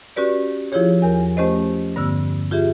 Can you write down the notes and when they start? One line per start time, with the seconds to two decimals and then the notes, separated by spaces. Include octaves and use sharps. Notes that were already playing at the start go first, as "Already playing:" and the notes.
0.16 C#4 F#4 G4 B4 D5
0.72 F3 E4 F4 G4 G#4 C#5
1.02 E2 A#4 G#5
1.37 A3 C#4 G4 C5 D#5
1.96 G2 D3 B3 E6
2.51 F4 G4 G#4 E5